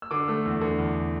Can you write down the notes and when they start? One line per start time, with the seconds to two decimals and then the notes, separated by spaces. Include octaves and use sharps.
0.02 E6
0.11 D3 D6
0.28 A3 E6
0.46 E2
0.61 D3
0.78 E2